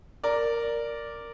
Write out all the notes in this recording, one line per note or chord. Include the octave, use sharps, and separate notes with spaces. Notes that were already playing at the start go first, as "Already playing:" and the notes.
A#4 D5